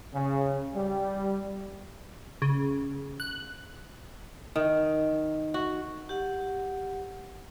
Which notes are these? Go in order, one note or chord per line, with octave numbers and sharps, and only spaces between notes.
C#3
G3
C#3
F#6
D#3
F#4
G4 F#5